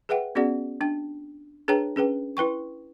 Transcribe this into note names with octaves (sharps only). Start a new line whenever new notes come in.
G#4 B4 E5 F#5 G5
B3 C#4 F#4 G#4 D5 F#5
D4 G5
D4 G#4 B4 C#5 G5 A#5
C#4 G#4 B4 G5
E4 B4 G5 C#6